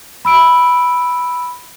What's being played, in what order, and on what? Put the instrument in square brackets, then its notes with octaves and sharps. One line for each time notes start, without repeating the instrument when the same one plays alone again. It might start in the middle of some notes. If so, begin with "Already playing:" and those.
[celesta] B5 E6 D7